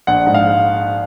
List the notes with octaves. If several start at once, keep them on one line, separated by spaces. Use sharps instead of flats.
A#1 F#5
G#2
F5